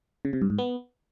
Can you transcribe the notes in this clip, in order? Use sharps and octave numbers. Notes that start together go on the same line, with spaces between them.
C#3
C3
G2
G#2
B3